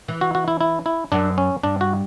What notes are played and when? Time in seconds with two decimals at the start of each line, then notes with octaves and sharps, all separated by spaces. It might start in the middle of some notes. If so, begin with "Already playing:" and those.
0.08 E3
0.21 F#4
0.35 F#4
0.48 E4
0.61 E4
0.86 E4
1.12 F#2 D4
1.38 C#4
1.63 G2 D4
1.81 F#4